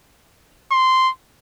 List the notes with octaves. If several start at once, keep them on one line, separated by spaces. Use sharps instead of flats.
C6